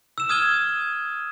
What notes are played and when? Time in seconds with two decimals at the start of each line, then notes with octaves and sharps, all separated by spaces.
0.18 E6 E7
0.29 D#6 F6 G#6 D#7 E7 G7